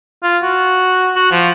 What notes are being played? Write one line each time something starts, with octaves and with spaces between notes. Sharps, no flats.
F4
F#4
F#4
F3